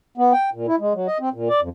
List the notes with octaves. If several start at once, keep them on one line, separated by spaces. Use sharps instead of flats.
B3
G5
A#2
E4
G#3
F#3
D#5
C4
A#2
D5
F2